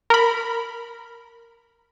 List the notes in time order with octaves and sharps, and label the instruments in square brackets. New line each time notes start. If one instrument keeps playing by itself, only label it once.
[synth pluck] A#4 B5